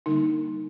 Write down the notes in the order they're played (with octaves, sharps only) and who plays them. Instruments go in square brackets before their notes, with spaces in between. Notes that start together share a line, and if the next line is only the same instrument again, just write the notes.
[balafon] D3 G3 A#3 D4 D#4